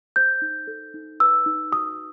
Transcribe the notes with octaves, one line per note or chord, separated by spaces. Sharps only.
C5 G6
D#4
A4
D#4
B4 E6
D#4
F#4 D#6